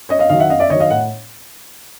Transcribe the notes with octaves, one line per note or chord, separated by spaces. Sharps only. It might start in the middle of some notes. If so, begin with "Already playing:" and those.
F#2 C#5 D#5
D#5 F5
D#3 F#3 D#5 F5
E5 F#5
F#2 D#5 F5
D5 E5
D#3 F#3 C#5 D#5
D#5 F5
A2 F#5